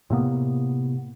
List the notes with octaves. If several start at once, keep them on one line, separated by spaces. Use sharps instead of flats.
A2 C3 A#3 B3